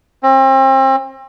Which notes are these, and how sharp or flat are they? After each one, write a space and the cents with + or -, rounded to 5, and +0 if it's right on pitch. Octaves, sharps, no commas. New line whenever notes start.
C4 +35